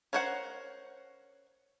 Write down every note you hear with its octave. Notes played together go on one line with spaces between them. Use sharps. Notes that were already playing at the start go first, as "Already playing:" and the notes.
C#4 A#4 C5 C#5 F#5